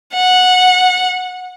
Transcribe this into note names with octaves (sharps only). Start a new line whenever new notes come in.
F#5